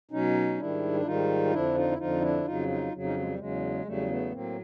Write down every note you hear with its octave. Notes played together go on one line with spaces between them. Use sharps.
B2 F#3 C#4 D#4
G#2 D#3 G3 D4 E4
E4
G#2 D#3 G3 D#4 F4
F2 D3 F3 D4 E4
D#4 F4
E4
F2 D3 F3 D#4 F4
D4 E4
F2 C#3 F#3 D#4 F4
D#4 F4
F2 C#3 F#3
C#4 D#4
G#3
G3
E2 C#3 F#3 G#3
E2 C#3 F#3 G3 A3
A3 B3
A2 F#3 A#3 C4